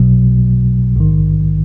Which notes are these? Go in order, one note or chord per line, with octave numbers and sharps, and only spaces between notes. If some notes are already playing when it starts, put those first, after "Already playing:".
Already playing: B1 B2 F#3
A#1 G#2 D#3